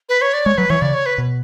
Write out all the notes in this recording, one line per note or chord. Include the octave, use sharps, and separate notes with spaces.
B4
C#5
D5
G#3 C#5
F#3 B4
E3 C#5
C#3 D5
C#5
B4
B2